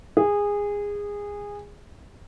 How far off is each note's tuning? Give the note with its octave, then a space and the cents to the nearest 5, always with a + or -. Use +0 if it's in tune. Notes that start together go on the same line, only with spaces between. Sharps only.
G#4 -20